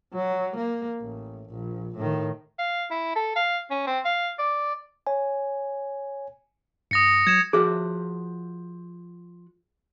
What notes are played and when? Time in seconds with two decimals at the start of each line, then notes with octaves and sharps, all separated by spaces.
0.14 F#3
0.57 A#3
1.01 A1
1.50 A#1
1.96 A2 D#3
2.59 F5
2.91 E4
3.16 A4
3.36 F5
3.71 C#4
3.87 C4
4.05 F5
4.39 D5
5.07 C#5 G#5
6.91 G2 D#6 A#6 C#7
7.27 F#3 G#6 E7
7.53 F3 F#4 G#4 E5